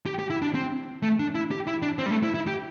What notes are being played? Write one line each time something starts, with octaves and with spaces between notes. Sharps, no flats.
G4
G4
E4
D4
C4
A3
D4
E4
G4
E4
D4
C4
G3
A3
E4
E4
G4